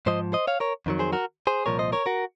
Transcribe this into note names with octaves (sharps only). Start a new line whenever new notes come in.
G#2 F3 C5 D#5
C5 D#5
C#5 F5
A#4 C#5
F2 D#3 F#3
G#4 C5
F#4 A#4
G#4 C5
C2 A#2 F3 A#4 C#5
C5 D#5
A#4 C#5
F#4 A#4